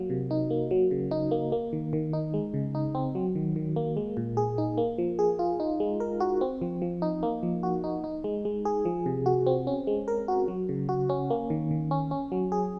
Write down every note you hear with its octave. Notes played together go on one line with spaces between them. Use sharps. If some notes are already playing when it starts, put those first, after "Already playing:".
Already playing: F#3 A#3
C3
D#4
A#3
F#3
C#3
D#4
A#3
A#3
D#3
D#3
D#4
G#3
C#3
D#4
C4
F#3
D#3
D#3
A#3
G#3
A#2
G#4
D#4
A#3
F3
G#4
F4
D#4
G#3
A#4
F#4
C4
F3
F3
D#4
A#3
F3
F#4
D#4
D#4
G#3
G#3
G#4
F3
C3
F#4
C4
C#4
G#3
A#4
F#4
F#3
C#3
F#4
C#4
A#3
D#3
D#3
C#4
C#4
F#3
G#4